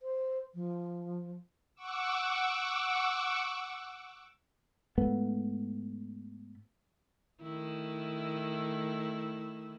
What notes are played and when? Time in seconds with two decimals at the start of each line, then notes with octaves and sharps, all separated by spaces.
0.02 C5
0.54 F3
1.75 F#5 C#6 D6 E6
4.98 G#2 A3 B3
7.43 D#3 A3 E4